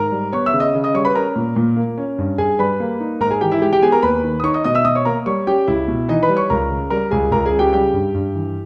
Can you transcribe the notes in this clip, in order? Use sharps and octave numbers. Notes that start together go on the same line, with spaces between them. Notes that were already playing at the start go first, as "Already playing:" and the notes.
Already playing: G#2 A#4 A#5
G3
B3 C#5 C#6
E5 E6
C#3
D#5 D#6
C#3
D#5 D#6
G3 C#5 C#6
B4 B5
C#4 A#4 A#5
A#2
A#2
A#3
C#4
G2
G2 G#4 G#5
G3 B4 B5
A#3
D#4
G#2 A#4 A#5
G#4 G#5
E3 G4 G5
E4 E5
G#3 G4 G5
G4 G5
B3 G#4 G#5
A#4 A#5
D#2 B4 B5
D#3
D#6
D#4 C#5 C#6
D#5 D#6
B2 D#5 D#6
E5 E6
B2 D#5 D#6
C#5 C#6
A#3 A#4 A#5
G3 C#5 C#6
C#4 G4 G5
C#2 E4 E5
B2
E3 D#4 D#5
B4 B5
G3
C#5 C#6
C#2 A#4 A#5
C#3
G3 A#4 A#5
C#2 G#4 G#5
C#2 A#4 A#5
G#4 G#5
C#3
G4 G5
G3 G4 G5
G2
G2
E3